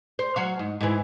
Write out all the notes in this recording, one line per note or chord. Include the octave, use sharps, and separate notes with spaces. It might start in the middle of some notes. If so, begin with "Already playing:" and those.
C5
F#3 F#4 F5
G#2
G#2 E3